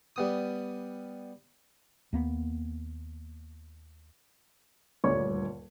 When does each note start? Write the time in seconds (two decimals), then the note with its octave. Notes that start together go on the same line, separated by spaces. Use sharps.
0.16 G3 B3 D#6
2.13 D#2 A#3 B3
5.04 D#1 D2 G2 C#5 D5 C#6